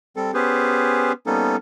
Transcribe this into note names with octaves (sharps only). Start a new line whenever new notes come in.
G3 C4 A4
B3 C#4 G4 G#4 B4 C5
G3 A#3 B3 C#4 D#4 A4